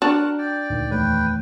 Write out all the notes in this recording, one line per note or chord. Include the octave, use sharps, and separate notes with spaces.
D4 F#4 A#4 F#5
D5 G5
D2 A#2 D#3
E2 A3 B4 C#5 G5